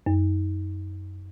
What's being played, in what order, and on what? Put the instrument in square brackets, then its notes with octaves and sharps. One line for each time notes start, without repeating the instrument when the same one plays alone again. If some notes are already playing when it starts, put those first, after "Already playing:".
[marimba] F#2